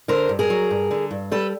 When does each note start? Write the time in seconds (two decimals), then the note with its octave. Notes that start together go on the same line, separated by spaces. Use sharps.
0.08 D3 A#4 C5
0.29 G2
0.39 G#4 A#4
0.50 F#3
0.71 G2
0.91 D3
1.11 G2
1.31 G3 A4 B4